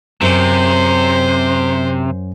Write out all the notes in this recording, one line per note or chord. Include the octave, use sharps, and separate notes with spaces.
F#2 C3 C5